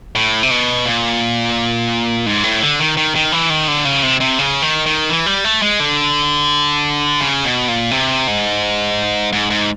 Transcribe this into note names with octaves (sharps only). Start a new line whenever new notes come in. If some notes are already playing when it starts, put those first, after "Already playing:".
A2
C3
B2
A#2
G#2
A2
D3
D#3
D#3
D#3
E3
D#3
D3
C#3
C3
C3
C#3
D#3
D#3
E3
G3
A3
G#3
D3
C#3
B2
A#2
C3
G#2
G#2
G#2